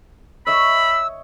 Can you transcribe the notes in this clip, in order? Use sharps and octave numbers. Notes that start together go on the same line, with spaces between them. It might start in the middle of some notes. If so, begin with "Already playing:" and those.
C#5 D#5 E5 B5 E6